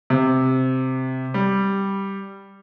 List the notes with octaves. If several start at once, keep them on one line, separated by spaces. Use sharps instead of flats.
C3
G3